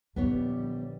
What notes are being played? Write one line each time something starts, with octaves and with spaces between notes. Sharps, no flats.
A#1 D#2 D3 G3 B3 C#5